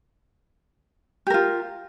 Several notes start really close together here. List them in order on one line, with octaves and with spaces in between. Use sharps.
G4 A#4 F4